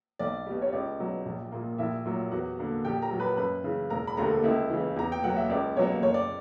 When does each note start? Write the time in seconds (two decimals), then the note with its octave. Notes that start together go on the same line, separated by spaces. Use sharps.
0.19 B1 D5
0.46 B2 G3
0.62 C#5
0.73 C#2 D5
1.00 B2 F#3
1.26 A#1
1.52 A#2 A#3
1.78 A#1 E4 E5
2.05 A#2 F#3
2.31 E2 F#4 F#5
2.59 D3 A#3
2.85 A#1 G4 G5
3.02 A#4 A#5
3.11 A#2 F#3
3.20 B4 B5
3.37 F#2 B4 B5
3.64 C#3 E3
3.90 E1 A#4 A#5
4.07 B5
4.17 D2 D3 G3 A#3 A#4 A#5
4.44 C#2 E4 E5
4.70 C#3 E3
4.96 E2 A#5
5.12 G5
5.23 B2 F#3 A#3 F#5
5.37 E5
5.49 C#2 D5
5.77 B2 F#3 A#3 C#5
6.02 F#1 C#5
6.14 D5